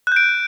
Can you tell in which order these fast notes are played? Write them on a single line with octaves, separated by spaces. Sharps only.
F#6 G6 D7